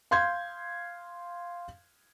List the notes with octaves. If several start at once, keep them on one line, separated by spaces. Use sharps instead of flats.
F5 C6 G6 G#6